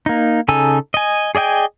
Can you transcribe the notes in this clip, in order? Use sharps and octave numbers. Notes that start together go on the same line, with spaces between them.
A#3 D#4
C#3 D#4 A4 G#5 E6
D#5 G#5
G#4 D5 D#5 G5 G#5